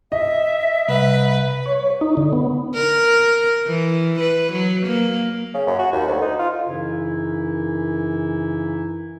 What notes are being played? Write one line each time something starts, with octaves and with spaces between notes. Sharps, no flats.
D#5 E5
C2 B4
C#5
D#4
D3
B3
A#4
E3
B4
F#3
A#3
C#3
F#2
F#4
D#2
D2
D#4
F4
F#2 C#3 E3 D#4 E4